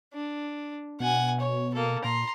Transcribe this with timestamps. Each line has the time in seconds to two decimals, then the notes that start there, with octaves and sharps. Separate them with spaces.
0.14 D4
1.00 B2 F#5 G#5
1.40 C#5
1.74 A#3 A4
2.04 A#2 A#5 C6